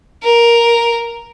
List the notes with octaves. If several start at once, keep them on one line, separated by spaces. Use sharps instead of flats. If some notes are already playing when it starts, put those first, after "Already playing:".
A#4